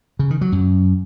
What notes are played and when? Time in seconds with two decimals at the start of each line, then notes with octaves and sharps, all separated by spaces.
0.19 C#3
0.30 D#3
0.41 F#3
0.52 F#2